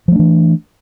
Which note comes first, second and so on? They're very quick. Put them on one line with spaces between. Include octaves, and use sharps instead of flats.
F3 A3 D4 E3